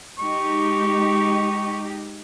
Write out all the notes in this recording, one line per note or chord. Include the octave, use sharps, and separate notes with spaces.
G#3 D#4 G4 C#6